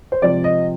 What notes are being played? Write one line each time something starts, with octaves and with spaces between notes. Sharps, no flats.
C5
C3 F3 G#3 D5
D#5